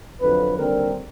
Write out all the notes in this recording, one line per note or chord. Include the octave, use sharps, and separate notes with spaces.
F2 D3 F#3 B4
D#2 D3 G3 C4 A#4